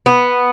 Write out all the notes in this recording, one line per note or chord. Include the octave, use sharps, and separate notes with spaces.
B3